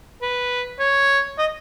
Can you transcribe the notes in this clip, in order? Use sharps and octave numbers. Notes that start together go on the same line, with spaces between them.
B4
C#5
D#5